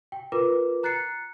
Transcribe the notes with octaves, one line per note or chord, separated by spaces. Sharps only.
G5
F4 A#4 B4 D6
A#5 F#6 A6 C7 C#7